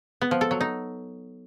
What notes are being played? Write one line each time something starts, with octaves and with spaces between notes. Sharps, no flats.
B3
F3
A4
F#3
D#4